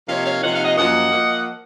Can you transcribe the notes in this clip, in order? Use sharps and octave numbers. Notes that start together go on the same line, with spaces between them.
C3 F3 A#3 D#4 C#5 F5
C#5 F5
C3 F3 A#3 D#4 F#5
F5
D#5 F#5
F#2 F3 A#3 D#5 F#5
F3 A#3